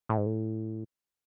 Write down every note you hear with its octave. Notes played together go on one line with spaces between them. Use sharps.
A2
G#2
A2